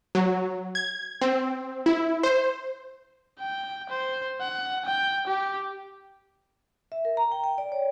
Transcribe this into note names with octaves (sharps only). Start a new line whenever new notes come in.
F#3
G#6
C4
E4
C5
G5
C5
F#5
G5
G4
E5
A#4
A#5
G5
G5
D5
C#5